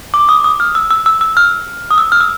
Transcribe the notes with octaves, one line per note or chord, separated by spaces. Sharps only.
D6
D#6
D#6
F6
E6
E6
E6
E6
F6
D#6
E6
F6
E6